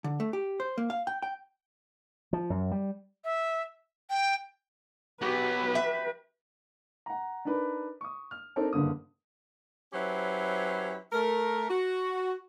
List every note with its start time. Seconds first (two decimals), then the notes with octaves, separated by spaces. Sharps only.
0.04 D3
0.20 A3
0.33 G4
0.60 C5
0.78 A#3
0.90 F5
1.07 G5
1.22 G5
2.33 F3
2.50 F#2
2.71 G3
3.24 E5
4.10 G5
5.21 F#3 B3 F#4 G4 B4
5.75 E5
7.06 F#5 A#5
7.45 D4 D#4 A#4 B4 B5
8.01 C#6 D#6
8.31 F6
8.56 C4 D4 D#4 A4 A#4 C5
8.73 F#1 G2 D3 A#3 D#6
9.93 F#3 C#4 E4 G4 B4 C5
11.13 A3 A#4
11.70 F#4